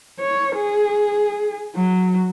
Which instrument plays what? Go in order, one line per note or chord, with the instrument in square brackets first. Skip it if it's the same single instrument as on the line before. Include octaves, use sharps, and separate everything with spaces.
[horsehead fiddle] C#5
G#4
F#3